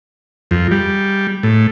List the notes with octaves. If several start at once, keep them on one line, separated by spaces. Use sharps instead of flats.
F2
G3
A2